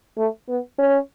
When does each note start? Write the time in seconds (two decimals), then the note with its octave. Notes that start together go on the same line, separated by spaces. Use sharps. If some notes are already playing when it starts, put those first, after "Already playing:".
0.18 A3
0.49 B3
0.78 C#4